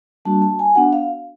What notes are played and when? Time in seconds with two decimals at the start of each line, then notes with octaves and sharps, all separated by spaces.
0.25 G3 A#3 D4 F#4 A5
0.42 A5
0.59 G#5
0.75 B3 D4 F#4 F#5
0.93 F5